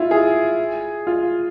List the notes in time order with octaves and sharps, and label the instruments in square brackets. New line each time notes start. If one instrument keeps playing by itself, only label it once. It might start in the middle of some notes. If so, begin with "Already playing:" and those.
Already playing: [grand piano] E4 F4
G#4
F4